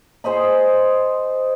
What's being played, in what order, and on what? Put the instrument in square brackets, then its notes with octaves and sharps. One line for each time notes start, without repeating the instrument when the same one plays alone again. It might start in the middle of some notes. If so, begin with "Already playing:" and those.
[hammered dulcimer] G#4 C5 D#5 B5